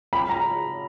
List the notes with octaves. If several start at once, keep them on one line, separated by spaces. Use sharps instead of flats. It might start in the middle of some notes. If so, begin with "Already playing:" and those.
B5
A#5